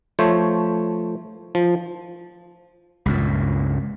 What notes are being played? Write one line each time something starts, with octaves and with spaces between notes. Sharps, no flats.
F3 A3 C5 C#5
F3
C#2 G2 A#2